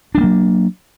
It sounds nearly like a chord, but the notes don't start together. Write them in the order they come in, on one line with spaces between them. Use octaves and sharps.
D4 G3 A#3 F#3